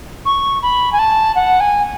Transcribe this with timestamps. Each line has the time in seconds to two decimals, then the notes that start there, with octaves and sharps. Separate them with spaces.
0.26 C#6
0.63 B5
0.93 G#5
0.99 A5
1.36 F#5
1.60 G#5